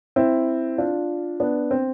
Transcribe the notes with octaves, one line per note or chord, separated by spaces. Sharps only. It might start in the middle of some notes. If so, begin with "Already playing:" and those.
C4 E4
D4 F4
B3 D4
C4